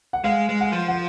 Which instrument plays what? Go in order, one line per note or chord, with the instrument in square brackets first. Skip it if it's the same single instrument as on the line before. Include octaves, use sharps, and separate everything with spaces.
[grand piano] F#5
[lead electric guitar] G#3 [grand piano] F5
[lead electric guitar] G#3
[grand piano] F#5
[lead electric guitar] F3
[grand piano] F#5